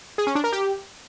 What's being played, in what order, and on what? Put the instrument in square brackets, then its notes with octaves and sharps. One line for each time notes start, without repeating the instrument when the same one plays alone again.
[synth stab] G#4
C#4
D4
A#4
G4